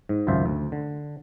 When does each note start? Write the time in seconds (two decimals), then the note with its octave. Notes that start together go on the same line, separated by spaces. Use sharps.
0.09 G#2
0.27 G#1 C#2 F#2 F4 C5 E5
0.46 D2
0.72 D3